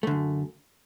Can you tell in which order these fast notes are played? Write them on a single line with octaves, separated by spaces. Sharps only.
A3 D3 F#2